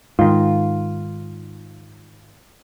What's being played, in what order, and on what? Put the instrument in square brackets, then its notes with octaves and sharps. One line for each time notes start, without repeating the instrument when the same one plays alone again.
[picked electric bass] G#2 D#3 [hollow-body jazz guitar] F4